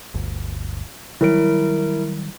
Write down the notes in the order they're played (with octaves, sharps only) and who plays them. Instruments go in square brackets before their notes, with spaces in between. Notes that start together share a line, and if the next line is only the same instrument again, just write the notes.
[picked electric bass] G1 D2
[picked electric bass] D#3 F#3 G3 [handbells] E4 A#4 D7